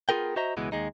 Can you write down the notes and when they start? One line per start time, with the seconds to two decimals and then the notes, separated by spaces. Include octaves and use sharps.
0.09 B3 F4 G#4 A#4 G5
0.36 F#4 C5 D#5 E5 A#5
0.57 C#2 B2 E3 G#3 B3
0.72 D#2 G#3 D#4